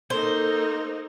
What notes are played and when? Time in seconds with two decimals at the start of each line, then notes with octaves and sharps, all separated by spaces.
0.10 A#3 D#4 A4 C5